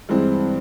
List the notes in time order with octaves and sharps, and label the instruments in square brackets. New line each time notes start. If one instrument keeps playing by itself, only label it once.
[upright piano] G2 E3 G#3 C4